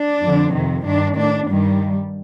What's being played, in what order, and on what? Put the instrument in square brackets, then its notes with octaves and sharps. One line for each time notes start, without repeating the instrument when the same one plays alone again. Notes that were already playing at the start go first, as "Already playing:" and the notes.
Already playing: [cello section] D4
F2 D3
F2 C3 D#3
G2 D#3 D4
A2 D4
G2 D#3 G3